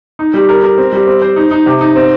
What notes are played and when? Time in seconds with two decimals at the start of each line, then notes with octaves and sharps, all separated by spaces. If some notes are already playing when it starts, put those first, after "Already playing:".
0.19 D#4
0.34 G3
0.49 A#4
0.63 A#4
0.78 C4
0.92 G3
1.07 C4
1.22 C5
1.36 D#4
1.51 D#4
1.66 C3
1.81 D#4
1.96 C4